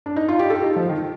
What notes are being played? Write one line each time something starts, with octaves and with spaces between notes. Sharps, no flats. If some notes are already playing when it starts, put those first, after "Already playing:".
D4
D#4
F4
G4
A4
D#4
F3
D#3